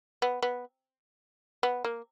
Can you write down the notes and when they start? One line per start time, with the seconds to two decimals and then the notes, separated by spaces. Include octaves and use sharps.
0.22 B3
0.42 B3
1.63 B3
1.84 A#3